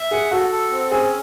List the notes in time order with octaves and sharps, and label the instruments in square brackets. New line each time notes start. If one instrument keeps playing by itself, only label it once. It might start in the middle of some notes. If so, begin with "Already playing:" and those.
Already playing: [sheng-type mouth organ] E5
[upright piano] G#4 [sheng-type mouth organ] F#5
[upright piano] F#4 [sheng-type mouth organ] A4
[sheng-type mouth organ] A4
C4
[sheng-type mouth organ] C#4 [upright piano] G#4